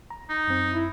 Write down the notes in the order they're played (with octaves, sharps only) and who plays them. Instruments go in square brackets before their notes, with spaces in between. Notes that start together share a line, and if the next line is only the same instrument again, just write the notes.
[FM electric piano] A#5
[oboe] D#4
[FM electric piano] F#2 C4
[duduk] E4